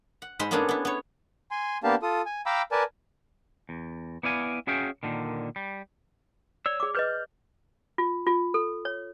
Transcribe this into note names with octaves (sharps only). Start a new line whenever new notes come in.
F#5
G#2 G#3 C5 B5 C6
A#3 B3 C#4 D4 G#4 A4
B3 E4
B3 C#5
G#5 C6
A#3 B3 D4 G4 F5 A5
F4 A4 D#6
G#5
F5 G5 A#5 B5 D6 E6
A#4 B4 D5 G#5 A5
E2
B3 E4 D5 F5 G#5
C#4 F#4 G#4 E5 F5 G5
A#2 D3 D#3
G3
C#5 D5 E6
G#4 D6
G#4 B4 D#5 F6 G6
F4
F4
A4
C#5